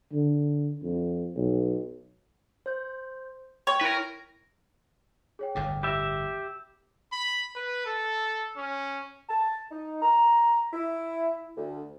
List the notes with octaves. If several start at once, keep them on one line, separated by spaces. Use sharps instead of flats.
D3
F2
B1
C5 G6
C#5 G5
E4 A#4 B4
G#4 C#5 G5
G1 E2 A2 G5 D6
G4 E5 B5 A#6
B5
B4
A4
C#4
A5
D#4
A#5
E4
D2